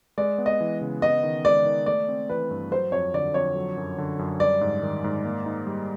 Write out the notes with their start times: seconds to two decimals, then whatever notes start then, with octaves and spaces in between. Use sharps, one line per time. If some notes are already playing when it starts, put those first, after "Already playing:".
0.18 G#3 D5
0.38 B3
0.46 D#5
0.61 E3
0.81 C#3
1.02 B3 D#5
1.23 D#3
1.45 G#3 D5
1.65 D#3
1.86 A3 D5
2.08 C4
2.29 E3 B4
2.51 G2
2.71 F#3 C5
2.92 F2 C#5
3.14 D3 D5
3.34 F2 C#5
3.56 F#3
3.77 F#2
3.98 D3
4.19 F#2
4.40 G3 D5
4.61 G#2
4.83 D#3
5.04 G#2
5.25 A#3
5.46 D#4
5.67 G3